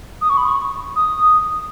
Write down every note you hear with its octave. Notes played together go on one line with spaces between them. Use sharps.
D#6
C#6
B5
C#6
D#6